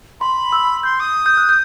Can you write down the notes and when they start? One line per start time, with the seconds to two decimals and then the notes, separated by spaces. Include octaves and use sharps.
0.20 B5 C6
0.52 E6
0.83 C6 G6
1.00 D#6
1.26 G6
1.37 F#6
1.49 G6